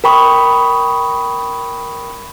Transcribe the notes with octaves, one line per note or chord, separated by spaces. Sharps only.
A#4 G5 B5 C#6 D#6